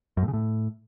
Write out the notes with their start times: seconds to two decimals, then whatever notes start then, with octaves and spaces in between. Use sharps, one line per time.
0.17 F#2
0.23 A2
0.28 C#3
0.33 A2